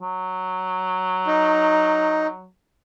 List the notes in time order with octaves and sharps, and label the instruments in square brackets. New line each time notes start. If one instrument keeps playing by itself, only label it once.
[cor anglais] F#3
[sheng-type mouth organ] D#4